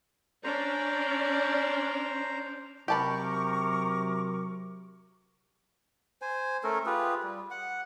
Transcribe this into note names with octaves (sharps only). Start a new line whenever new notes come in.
C#4 D4 C5 D5 A#5
C3 F#3 G4 A#4 A5 B5 C#6 D6
C5 G#5
A3 C#4 A4 A#4
F4 G4 G#4 B4
G3
F#5